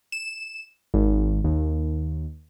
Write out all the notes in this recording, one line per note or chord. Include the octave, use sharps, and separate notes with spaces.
E7
G#1
D#2